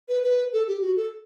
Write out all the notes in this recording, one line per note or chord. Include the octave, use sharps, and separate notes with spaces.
B4
B4
A4
G4
F#4
A4